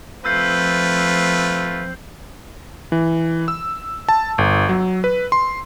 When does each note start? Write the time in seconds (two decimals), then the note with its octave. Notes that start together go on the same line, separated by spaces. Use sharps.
0.25 F3 A3 C4 F4 B4 E6 G6 C7
2.92 E3
3.48 E6
4.09 A5
4.38 G1
4.69 F#3
5.04 B4
5.32 C6